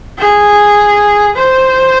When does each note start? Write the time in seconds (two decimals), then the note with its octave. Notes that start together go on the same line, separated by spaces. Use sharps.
0.19 G#4
1.36 C5